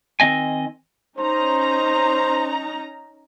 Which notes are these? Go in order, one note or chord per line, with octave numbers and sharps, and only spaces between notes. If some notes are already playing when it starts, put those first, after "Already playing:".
D#3 C4 D#5 G#5
C#4 D#4 C5 A#5